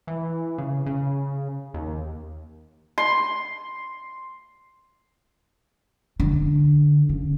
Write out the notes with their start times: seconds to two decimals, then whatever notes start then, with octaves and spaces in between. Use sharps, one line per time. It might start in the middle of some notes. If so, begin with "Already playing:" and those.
0.07 E3
0.58 C#3
0.86 C#3
1.74 D#2
2.98 C6
6.20 D3
7.09 C#3